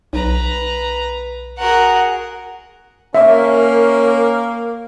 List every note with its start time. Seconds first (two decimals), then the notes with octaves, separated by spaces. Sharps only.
0.13 B1 B4 A#5
1.58 F#4 G#4 A#4 F#5
3.15 A#3 C#4 E5